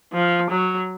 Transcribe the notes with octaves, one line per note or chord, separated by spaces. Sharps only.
F3
F#3